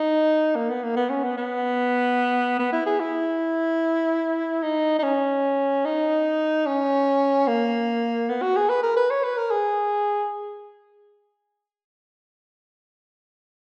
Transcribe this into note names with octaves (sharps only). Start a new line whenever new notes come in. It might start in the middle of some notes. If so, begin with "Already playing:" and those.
Already playing: D#4
A#3
B3
A#3
B3
C#4
B3
B3
B3
E4
G#4
E4
D#4
D#4
C#4
D#4
C#4
A#3
B3
F#4
G#4
B4
A#4
B4
C#5
B4
A#4
G#4